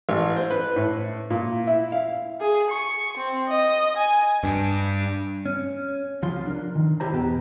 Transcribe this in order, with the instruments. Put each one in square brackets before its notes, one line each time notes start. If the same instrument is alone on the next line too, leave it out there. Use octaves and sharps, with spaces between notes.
[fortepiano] A1
C5
B4
A2
A#2
E4
F5
[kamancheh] G#4
C#6
C4
D#5
G#5
[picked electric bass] G2
[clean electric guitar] C#4
C2 F3 F4 C6
D4 A#4
D#3
C2 E4 G4 C5 A#5
E2 B2 B3 G4